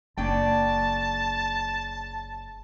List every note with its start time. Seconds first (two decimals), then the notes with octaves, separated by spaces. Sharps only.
0.17 F#1 C#3 D4 G5 A5